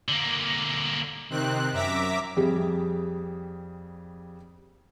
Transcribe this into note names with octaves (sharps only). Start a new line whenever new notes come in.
D3 A#3
C3 D#3 C4 F#6
F#2 E5 A#5 D6 B6
F2 G3 G#4